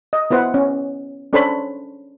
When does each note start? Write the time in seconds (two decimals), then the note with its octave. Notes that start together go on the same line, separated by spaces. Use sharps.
0.13 D#5
0.31 B3 E4 B4 C5 F#5
0.54 C#4
1.33 C#4 D4 A4 C5 C#5 B5